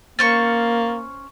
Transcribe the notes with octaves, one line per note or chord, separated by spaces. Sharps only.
A#3 C#4 C5 C#6 A6